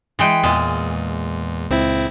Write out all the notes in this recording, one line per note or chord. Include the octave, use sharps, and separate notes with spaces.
E3 G#3 G5
E2 A#2 G#3
C#2 C4 E4